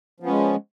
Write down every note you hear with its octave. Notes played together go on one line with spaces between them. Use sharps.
F3 G#3 B3 C#4